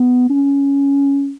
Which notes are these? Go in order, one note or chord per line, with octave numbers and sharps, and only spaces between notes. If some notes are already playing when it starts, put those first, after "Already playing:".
Already playing: B3
C#4